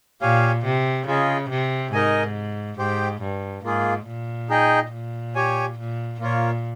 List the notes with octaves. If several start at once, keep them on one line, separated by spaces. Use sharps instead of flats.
A#2 G4 C#5 F5 G#5
C3
C#3 F4 G#4 D#5
C3
G#2 D#4 A#4 D#5 G#5
G#2 G4 C5 G5
G2
G#2 A#3 F4 G#4
A#2
D#4 G#4 D#5 G5
A#2
G4 C#5 G#5
A#2
A#2 A#3 F4 A#4 C#5